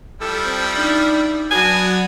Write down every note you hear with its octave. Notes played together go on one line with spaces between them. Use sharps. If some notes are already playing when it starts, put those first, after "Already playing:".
F3 G3 E4 A4
C4
D4 D#4
F#3 B3 D4 F#4 G#5